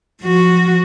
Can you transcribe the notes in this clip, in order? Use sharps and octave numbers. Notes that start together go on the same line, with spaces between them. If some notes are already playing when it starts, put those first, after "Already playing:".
F3 F#4